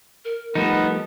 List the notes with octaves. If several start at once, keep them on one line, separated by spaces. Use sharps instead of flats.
A#4
F3 G3 A3 B3 D#4 A#4